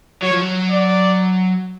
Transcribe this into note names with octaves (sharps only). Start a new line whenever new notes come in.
F#3 C#5
F3
F#3
D5